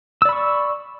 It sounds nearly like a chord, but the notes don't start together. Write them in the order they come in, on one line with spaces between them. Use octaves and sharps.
E6 D5 B5 C#6